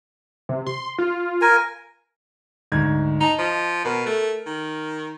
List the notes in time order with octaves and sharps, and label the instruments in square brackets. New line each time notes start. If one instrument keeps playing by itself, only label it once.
[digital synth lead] C3
C6
F4
[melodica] A#4 G#5
[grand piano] D2 G#2 G#6
[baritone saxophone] D#4 [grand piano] D#5 A5
[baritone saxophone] F3
[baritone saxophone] B2 [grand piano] A#4
[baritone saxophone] A3
D#3